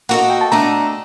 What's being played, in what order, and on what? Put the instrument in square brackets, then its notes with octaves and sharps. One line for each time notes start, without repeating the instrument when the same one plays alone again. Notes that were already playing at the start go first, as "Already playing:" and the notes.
[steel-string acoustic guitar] A#3 F#4 A4 D#5 [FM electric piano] F#5
[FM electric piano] G5
A5
[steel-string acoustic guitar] A3 D4 A4 D#5 [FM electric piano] A#5